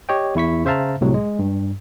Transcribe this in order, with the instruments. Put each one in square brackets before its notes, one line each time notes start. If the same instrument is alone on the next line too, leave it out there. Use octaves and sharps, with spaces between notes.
[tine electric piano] G4 C#5 D#5 G5
E2 E4 C#6 B6
C#3 C5 E5 F5 A5 A#5
C2 A2 C3 F#3
G#3
G2